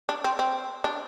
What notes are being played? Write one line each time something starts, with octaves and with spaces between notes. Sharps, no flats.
D4
C4
C4
D4